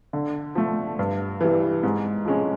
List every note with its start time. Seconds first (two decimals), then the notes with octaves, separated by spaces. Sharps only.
0.13 D3
0.55 F3 A3
0.99 G2
1.41 E3 G3
1.83 G#2
2.25 F3 G#3 C#4